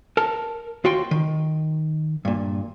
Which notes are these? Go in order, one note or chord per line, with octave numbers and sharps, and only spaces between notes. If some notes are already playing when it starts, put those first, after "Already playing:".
A#4 A5
D#2 F4 F#4 G5 C6
D#3
G2 A#2